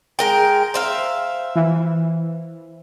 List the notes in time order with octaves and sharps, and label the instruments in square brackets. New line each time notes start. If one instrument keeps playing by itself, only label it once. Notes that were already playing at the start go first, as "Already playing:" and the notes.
[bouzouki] G#3 A#4 G5
C5 E5 F5
[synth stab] E3